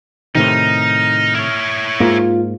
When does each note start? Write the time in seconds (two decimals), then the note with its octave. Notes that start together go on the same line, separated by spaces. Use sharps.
0.35 A2 C3 D#3 D#4 F6
1.35 E4 C#5
2.00 G#2 A#3 F4